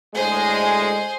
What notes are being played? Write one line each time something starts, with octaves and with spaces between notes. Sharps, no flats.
D2 A2 G#3 G#4 C5